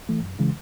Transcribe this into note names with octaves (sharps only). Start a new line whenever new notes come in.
E3 A3
F#2
C#3 E3 G#3